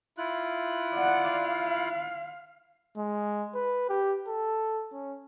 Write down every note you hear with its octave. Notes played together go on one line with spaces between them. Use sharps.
E4 F4 F#6
D5 F#5
F5
G#3
B4
G4
A4
C#4